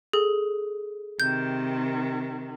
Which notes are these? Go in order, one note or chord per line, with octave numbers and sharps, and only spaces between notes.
G#4 A4
C3 D#3 G6